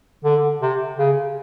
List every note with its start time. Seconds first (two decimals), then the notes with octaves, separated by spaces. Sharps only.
0.24 D3
0.62 C3
0.98 C#3